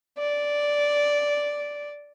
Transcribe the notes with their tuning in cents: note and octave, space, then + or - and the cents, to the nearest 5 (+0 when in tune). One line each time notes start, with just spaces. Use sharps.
D5 -5